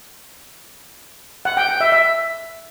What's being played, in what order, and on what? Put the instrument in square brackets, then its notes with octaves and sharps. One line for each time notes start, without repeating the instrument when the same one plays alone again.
[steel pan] F#5
G5
G5
E5
E5